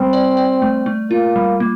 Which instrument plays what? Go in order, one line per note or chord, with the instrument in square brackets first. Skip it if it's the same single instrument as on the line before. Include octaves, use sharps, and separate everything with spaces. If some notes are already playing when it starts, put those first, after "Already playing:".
Already playing: [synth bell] G3 [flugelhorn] C4
[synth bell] D5
D5
A3
A3
[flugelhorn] A#3 [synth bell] F4
[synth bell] G3
A#3